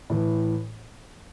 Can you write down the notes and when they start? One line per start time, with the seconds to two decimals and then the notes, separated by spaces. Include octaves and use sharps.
0.10 A2 E3